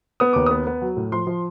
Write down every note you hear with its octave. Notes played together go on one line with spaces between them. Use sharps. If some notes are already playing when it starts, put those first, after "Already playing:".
B3 D#6
D#2 D6
D#6
B3
B3
F#3
A2
F3 C6
F3